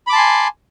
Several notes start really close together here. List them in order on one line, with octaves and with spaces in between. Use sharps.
B5 D6 A5 C6 G#5